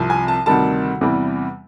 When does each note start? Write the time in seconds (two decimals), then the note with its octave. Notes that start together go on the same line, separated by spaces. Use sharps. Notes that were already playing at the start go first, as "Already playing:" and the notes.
Already playing: C2 C3 F3
0.10 G#5
0.28 A5
0.46 D2 C3 D#3 G3 A5
1.01 E2 C3 E3 G3